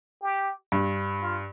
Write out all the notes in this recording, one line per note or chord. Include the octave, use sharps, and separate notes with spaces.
G4
G2
F4